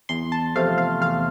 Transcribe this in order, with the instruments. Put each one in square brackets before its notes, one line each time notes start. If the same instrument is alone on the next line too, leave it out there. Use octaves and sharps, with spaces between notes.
[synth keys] E2 C6
A5
C3 F3 A3 F5
F5
E2 F5